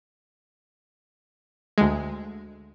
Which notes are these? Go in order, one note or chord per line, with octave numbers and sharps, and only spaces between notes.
D2 G#3